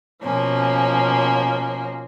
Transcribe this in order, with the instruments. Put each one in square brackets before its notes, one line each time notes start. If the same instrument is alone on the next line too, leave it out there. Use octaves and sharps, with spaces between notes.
[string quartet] B2 F3 A#3 C#4